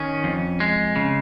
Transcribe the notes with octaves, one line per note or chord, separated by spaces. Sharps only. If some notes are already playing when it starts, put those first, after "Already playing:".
Already playing: D#3 C#4
F2
G#3
C#3